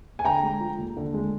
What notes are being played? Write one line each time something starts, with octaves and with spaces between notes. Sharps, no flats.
G#5
D3 G5 A#5
G#3
F3
D#2
D3
G#3